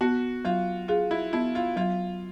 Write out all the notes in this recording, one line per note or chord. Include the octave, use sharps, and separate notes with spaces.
B3 F#4
F#3 F4
F4 G#4
E4
B3 E4
F4
F#3 F4